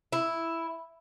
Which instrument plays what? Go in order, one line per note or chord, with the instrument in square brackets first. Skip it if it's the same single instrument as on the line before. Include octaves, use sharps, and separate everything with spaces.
[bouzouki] E4